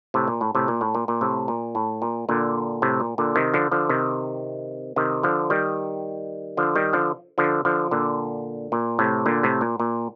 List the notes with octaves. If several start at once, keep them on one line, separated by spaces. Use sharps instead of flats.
A2 C3
A#2
A2
A2 C3
A#2
A2
A#2
A#2
A2 C3
A#2
A2
A#2
A#2 D3
A2 C3
A#2
A#2 D3
C3 D#3
D3 F3
D3 F3
C3 D#3
C3 D#3
D3 F3
D#3 G3
D3 F3
D#3 G3
D3 F3
D3 F3
D3 F3
A#2 D3
A#2
A2 C3
A#2 D3
A2 C3
A#2
A#2